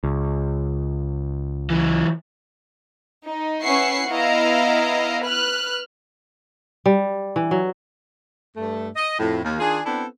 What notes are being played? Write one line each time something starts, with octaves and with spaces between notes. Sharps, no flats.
C#2
E3 F#3
D#4
C#4 E4 B4 F#5 C#6 C7
B3 E4 D#5 F5 A#5
B4 F6 F#6
G3
E3
F#3
G2 A3
D#5
F2 A2
D#2
D#3 D4 F4 G#4
B3 C4 D4 E4 A4